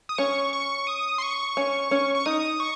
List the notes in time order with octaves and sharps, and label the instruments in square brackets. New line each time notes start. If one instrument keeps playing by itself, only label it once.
[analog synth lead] D#6
[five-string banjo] C#4 [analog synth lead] C#6
[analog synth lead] C#6
D#6
C6
C#6
[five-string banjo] C#4
C#4
[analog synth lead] C#6
[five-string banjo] D#4 [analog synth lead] D#6
[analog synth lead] C#6